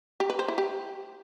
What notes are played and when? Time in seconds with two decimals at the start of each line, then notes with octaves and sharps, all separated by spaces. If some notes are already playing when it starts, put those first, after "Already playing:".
0.20 G4
0.30 B4
0.39 C5
0.48 E4
0.58 G4